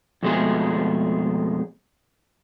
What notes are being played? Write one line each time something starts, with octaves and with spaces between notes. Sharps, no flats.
F2 B2 G#3 A3 G#4